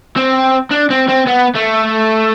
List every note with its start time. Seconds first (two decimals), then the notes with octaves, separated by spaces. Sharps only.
0.16 C4
0.71 D4
0.90 C4
1.09 C4
1.27 B3
1.55 A3